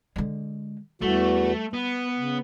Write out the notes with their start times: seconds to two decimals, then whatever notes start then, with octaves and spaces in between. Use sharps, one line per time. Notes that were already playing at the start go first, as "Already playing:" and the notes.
0.16 D3 G#3
1.02 E2 E3 G3 A3 F#4
1.73 B3 B4
2.18 C#3